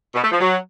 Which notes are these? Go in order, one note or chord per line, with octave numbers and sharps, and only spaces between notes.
B2
A3
F3
F#3